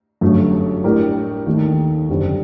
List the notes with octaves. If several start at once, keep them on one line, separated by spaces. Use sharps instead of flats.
G1 F#2 F#3 A3
A2 G3 D4 G4 A#4
D#2 D#3 A3
F#1 F#2 D3 G3 C4